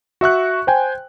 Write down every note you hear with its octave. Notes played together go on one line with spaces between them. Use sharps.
F#4 E5 C#6 F#6
C5 G5 G#5